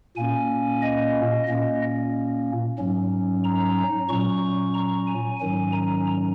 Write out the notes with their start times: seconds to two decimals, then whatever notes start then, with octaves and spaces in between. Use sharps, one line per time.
0.16 A#2 A#3 C#4 G#5
0.82 D#5
1.47 A#2 A#3 C#4 D#5
2.78 G#2 F#3 C#4
3.44 A#5
4.09 A#2 F#3 C#4 C#6
4.74 A#5
5.07 G#5
5.40 G#2 D#3 F#3 C#4 G#5
5.72 A#5